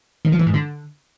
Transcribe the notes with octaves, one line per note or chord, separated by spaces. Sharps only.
D#3
F3
E3
G#2
D3